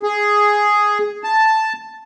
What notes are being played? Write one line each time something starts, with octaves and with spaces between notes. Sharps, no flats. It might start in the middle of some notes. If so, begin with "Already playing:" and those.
G#4
A5